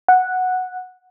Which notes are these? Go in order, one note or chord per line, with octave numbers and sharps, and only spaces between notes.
F#5